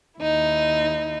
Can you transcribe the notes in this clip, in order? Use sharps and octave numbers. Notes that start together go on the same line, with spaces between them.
D#2 D#4 E4